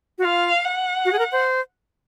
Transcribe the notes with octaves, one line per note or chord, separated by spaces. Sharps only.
F#4
F4 F5
F#5
F#4
G#4
A#4
C5